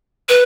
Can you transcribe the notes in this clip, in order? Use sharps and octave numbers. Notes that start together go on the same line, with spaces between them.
B4